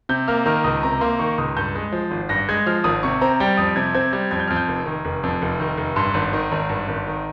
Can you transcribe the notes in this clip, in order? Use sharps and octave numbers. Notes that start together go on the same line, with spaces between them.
C3 G6
A#3 F6
D#3 F6
F6
C#2 D#6
C3 A#5
A#3 C6
D#3 C#6
C#2 D#6
G2 G6
G#3
F3
G#1
G2 A#6
G#3 G#6
F3 F6
G#1 D#6
C3 C#6
C4 A#5
G3 G5
F2 D#6
C3 G#6
C4 G#6
G3 G#6
F2 G#6
G6
F2 F6
G6
F1
D#3
F1
F2
F1
D#3
F1
G2 C6
G#1
D#3
G#1
G2
G#1
D#3